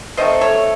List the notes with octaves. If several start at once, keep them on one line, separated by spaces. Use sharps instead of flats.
D#3 A3 C4 C5 D#5
A4 C#5